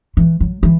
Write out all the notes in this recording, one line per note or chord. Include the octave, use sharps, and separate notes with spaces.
E3
F#3
E3